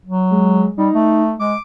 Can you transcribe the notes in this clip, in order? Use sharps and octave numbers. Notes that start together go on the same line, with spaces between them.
F#3
G#3
G3 D#4
A3
G#3 D6